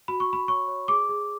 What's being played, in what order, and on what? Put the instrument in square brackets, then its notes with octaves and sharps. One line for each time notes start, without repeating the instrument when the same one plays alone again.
[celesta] F#4 B5
C#6
F#4
B5
C#5 C#6
C#5
G#4 D6
G#4